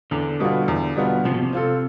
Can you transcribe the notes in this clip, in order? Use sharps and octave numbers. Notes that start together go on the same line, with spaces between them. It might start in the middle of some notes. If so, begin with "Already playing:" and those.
E2 D3
B2 G3 B3 F4
E2
B2 G3 B3 F4
C3 F3
B2
C3
C4 F4 A4